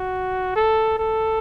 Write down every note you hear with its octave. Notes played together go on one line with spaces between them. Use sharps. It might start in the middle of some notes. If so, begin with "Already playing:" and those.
Already playing: F#4
A4
A4